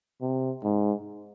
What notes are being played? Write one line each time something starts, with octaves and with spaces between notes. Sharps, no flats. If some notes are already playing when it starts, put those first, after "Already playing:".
C3
G#2